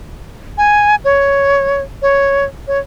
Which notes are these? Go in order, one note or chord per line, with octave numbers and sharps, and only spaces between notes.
G#5
C#5
C#5
C#5